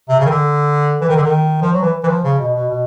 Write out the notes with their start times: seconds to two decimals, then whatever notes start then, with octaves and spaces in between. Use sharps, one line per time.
0.09 C3
0.19 C#3
0.26 D#3
0.30 D3
1.01 E3
1.08 D#3
1.16 D3
1.23 D#3
1.62 F3
1.73 F#3
1.82 E3
2.03 E3
2.08 F3
2.24 C#3
2.39 B2
2.54 B2
2.69 B2